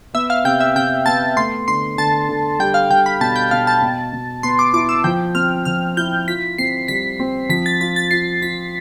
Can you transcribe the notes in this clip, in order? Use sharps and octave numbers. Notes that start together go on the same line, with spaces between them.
B3 E5
F5
C3 G5
E5
C3 G5
B3 A5
A3 C6
D3 C6
D3 A5
D3
G3 G5
F5
G3 G5
B5
B2 A5
G5
B2 F5
A5
B2
B2
B3 C6
D6
E4 D6
E6
F3 G5
C4 F6
F3 F6
E4 G6
F4 B6
C4 C7
G3 B6
C4
F3 B6
A6
F4 A6
A6
F4 C7
F4 B6